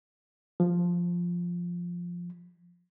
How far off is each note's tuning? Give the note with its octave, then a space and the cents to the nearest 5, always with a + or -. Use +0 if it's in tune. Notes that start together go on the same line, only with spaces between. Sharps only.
F3 +0